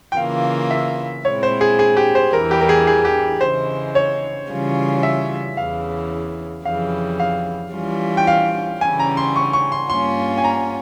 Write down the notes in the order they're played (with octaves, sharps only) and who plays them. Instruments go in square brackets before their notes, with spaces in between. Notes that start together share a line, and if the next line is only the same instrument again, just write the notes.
[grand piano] G5
[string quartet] C#3 E3 A#3 F4 [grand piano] F5
[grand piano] E5
[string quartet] A#2 G#3 C4 E4 [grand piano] C#5
[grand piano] C5
G#4
G#4
G4
C5
[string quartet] E2 E3 G3 [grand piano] A#4
[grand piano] G4
A#4
G#4
G#4
G4
[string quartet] C#3 E3 G#3 [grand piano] C5
[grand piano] C#5
[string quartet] C#3 E3 G3 C#4 F4
[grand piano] E5
[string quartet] E2 C#3 E3 [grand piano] F5
[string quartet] F2 C#3 E3 G3 [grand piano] F5
[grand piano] F5
[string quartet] E3 G3 C#4 F4
[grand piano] G5
F5
[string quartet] C#3 E3 G3 C#4 [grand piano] G#5
[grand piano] A#5
C6
C#6
C#6
C6
[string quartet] G2 G3 A#3 C#4 F4 [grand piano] C6
[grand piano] G#5
A#5